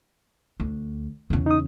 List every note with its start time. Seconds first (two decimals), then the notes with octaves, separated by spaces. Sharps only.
0.60 D2
1.30 E2 C#3
1.46 D#4 D#6